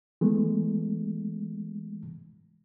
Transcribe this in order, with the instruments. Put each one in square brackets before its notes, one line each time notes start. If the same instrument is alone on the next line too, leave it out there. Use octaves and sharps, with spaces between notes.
[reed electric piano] E3 G#3 A3 B3